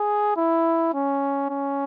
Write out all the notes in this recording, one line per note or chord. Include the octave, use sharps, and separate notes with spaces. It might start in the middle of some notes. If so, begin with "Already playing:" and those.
Already playing: G#4
E4
C#4
C#4